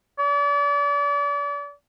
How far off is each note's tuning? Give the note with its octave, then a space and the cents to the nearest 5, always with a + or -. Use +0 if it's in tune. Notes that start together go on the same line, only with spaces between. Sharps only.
D5 -35